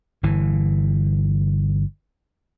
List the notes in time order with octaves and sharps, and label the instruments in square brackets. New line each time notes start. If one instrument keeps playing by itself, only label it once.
[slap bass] G1 E3